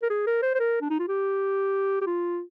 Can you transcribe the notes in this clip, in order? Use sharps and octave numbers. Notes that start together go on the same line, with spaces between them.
A#4
G#4
A#4
C5
C5
A#4
D4
D#4
F4
G4
G4
F4